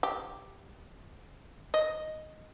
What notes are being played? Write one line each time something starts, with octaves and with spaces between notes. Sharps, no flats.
G4
D#5